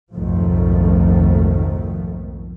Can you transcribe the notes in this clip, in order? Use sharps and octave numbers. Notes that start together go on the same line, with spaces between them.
B1 F2 G#2 D#3 F3 A3